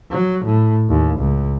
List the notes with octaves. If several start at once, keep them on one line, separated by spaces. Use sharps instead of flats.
F#3
A2
D#2
C#2